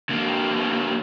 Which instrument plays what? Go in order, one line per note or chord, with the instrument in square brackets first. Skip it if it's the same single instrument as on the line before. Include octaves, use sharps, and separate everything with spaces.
[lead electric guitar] D3 A#3